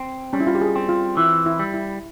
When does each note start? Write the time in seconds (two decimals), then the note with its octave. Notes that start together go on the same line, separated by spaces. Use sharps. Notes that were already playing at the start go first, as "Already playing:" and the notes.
Already playing: C4
0.33 G3 C#4
0.40 E4
0.47 F4
0.55 G4
0.61 G#4
0.76 C4
0.89 F4
1.17 E3 E4
1.46 E4
1.59 G3
1.74 E4